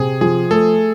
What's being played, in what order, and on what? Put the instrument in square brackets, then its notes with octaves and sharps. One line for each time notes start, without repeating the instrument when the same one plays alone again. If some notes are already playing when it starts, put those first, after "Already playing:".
Already playing: [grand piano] C3 [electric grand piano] G#4
[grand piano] F3 [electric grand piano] G#4
[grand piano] A3 [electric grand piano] A4